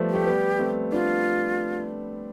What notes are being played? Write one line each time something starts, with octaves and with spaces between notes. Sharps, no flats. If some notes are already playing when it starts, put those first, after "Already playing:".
Already playing: F3 G3 A3 B3
A3 G4
G3 B3
A3 C4
B3 D4 F4